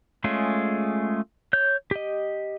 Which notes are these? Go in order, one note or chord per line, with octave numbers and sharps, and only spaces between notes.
G#3 A3 C#4 F4 G#4
C#5 G6
G4 D#5